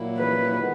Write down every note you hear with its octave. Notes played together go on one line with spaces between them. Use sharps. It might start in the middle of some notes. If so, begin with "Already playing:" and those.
Already playing: A#2 F#3 A#3 E4
B4
D#3 G#3 B3